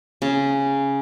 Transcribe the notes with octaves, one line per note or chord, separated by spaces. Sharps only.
C#3